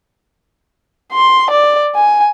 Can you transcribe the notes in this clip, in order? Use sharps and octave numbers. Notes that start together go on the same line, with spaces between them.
C6
D5
G#5